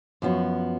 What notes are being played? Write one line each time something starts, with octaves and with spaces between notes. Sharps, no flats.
F#2 F3 B3 F#4